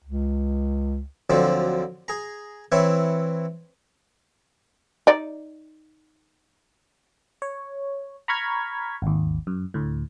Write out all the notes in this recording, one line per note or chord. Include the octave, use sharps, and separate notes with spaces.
C#2
D2 D3 F3 F#3 C4
G#4 A#5
E3 C4 E4 C#5
D#4 D5
C#5
A#5 B5 C#6 F6 G#6 B6
G#1 D#2
F#2
D2 A2